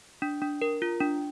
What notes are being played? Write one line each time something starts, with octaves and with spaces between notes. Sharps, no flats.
D4
D4
A#4
F4
D4